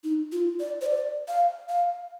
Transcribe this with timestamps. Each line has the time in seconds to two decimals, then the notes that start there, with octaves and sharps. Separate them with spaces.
0.04 D#4
0.32 F4
0.60 D5
0.81 C5
0.86 D5
1.28 F5
1.69 F5